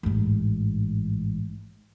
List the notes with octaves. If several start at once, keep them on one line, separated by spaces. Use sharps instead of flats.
A1 G#2